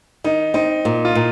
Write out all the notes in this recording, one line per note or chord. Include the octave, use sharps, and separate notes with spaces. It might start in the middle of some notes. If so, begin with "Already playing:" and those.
D#3 D#4
C4 D#4
A#2
F4
A#2